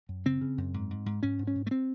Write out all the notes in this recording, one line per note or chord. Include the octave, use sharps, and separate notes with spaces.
F#2
C#3 C4
C#3
F#2
G#2
G#2
G#2
G#2 C#4
G#2
C#4
G#2
A3
C4